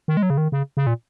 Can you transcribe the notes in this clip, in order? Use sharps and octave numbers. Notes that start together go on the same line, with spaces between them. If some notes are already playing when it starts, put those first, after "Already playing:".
D#3
G#3
F#3
C#3
D#3
C#3
C#3
A#2